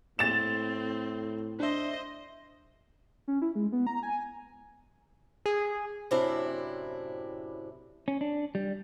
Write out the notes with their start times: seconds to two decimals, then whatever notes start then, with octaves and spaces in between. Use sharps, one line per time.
0.19 A2 C4 A6 E7
1.60 D4 C5 D#5 E5
3.28 C#4
3.42 E4
3.55 G#3
3.72 B3
3.87 A#5
4.03 G#5
5.46 G#4
6.11 F#2 A2 C3 C4 D4 E4
8.08 C#4
8.21 D4
8.55 G3